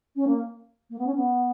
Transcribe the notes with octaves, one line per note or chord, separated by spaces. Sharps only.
C#4
A#3
A#3
B3
C#4
B3